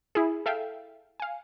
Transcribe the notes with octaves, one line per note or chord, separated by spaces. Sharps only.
E4 G#4
A4 E5 F5 G5
F5 G#5